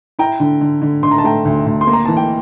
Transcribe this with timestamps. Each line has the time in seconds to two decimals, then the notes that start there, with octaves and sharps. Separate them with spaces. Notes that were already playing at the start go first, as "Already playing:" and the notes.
0.19 E4 G5 A#5
0.40 D3
0.61 D3
0.82 D3
1.03 D3 C6
1.11 A#5
1.18 A5
1.24 A3 G5 A#5
1.45 D2
1.66 D2
1.81 C6
1.87 A#3
1.93 A#5
2.05 E3 A5
2.17 G5